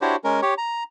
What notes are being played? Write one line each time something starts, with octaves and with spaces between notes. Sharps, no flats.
D4 E4 F#4 G4 C5 C#5
G#3 C#4 A#4
G4 C#5
A#5